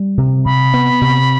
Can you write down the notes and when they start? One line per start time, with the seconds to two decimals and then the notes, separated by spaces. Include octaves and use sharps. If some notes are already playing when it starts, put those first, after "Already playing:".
Already playing: G3
0.18 C3
0.45 C3 B5
0.74 B3
1.01 C3